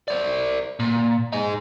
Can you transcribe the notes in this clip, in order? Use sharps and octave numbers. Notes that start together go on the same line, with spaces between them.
C5 D5
A#2
D#4 G#4